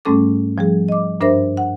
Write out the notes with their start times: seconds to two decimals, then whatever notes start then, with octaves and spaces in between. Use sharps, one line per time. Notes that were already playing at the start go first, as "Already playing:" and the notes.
0.05 G#2 G3 A3 C#4 A4 D6
0.58 F3 G3 G#4
0.89 D#5 D6
1.20 G2 D4 A#4 C5 E5 A#6
1.57 F#5